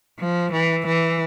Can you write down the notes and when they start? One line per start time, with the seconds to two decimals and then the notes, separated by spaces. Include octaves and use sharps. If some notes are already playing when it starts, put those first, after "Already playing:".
0.20 F3
0.53 E3
0.87 E3